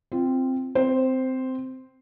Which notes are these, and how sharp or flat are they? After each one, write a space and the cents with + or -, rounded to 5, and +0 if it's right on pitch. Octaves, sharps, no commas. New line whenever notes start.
C4 +0 F4 -10
C4 -15 C5 +0